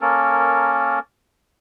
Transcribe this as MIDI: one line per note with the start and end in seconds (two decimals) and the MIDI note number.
0.01 0.99 58
0.01 0.99 61
0.01 0.99 69
0.01 0.99 70